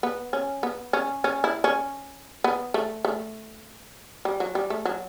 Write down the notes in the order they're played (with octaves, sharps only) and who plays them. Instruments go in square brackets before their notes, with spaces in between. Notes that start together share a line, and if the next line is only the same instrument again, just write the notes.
[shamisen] B3
C#4
B3
C#4
C#4
E4
C#4
B3
A3
A3
G3
F#3
G3
A3
F#3